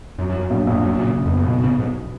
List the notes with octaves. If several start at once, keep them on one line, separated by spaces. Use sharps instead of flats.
F#2 F#3
F#2
F#3
F#2
A#1 F#2
A#1 F2
F#2 F#3
A#2 C#3
C#3
F2
B3
F#2
B1 B2
B1 C#3
B1 G#2